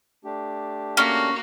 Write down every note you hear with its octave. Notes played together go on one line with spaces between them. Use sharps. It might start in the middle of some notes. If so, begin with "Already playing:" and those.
A3 D4 G4
A#3 C#4 F#4